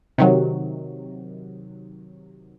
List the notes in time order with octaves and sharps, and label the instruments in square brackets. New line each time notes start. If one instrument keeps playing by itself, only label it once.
[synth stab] C3 D#3 F#3